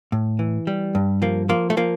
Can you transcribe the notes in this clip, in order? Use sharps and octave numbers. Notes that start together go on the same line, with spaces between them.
A2
E3
G3
G2
F3 A#3
F3 A#3
A3
F3 A#3